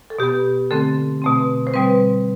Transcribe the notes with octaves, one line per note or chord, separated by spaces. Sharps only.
A4
B2 B3 G4
D3 A3 C4 A4
B2 A3 C4
C5
B2 G3 C4 B4